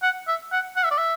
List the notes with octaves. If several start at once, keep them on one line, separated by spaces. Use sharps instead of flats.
F#5
E5
F#5
F#5
E5
D5
E5